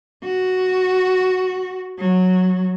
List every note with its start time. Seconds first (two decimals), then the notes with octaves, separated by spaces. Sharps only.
0.24 F#4
1.99 F#3